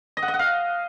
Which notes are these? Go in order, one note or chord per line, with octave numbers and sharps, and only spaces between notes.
D#5
F#5
D#5
F#5
F5